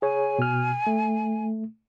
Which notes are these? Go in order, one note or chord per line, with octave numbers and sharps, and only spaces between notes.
G#4 C#5 G#5
B2 F6
A3